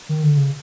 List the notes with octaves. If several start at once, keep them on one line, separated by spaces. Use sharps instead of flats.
D#3
D3
C#3